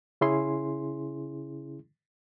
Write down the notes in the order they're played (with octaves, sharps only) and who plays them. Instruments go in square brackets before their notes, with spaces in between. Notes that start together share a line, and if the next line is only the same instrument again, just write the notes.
[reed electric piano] C#3 C#4 E4 G#4 C6